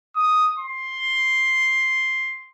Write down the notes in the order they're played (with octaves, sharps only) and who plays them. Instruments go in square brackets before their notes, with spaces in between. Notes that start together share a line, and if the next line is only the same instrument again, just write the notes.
[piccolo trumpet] D#6
C6